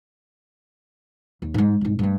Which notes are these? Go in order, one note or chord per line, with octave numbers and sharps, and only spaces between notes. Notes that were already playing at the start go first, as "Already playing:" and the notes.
D#2
G#2 G#3
C2 G#2
G2 A3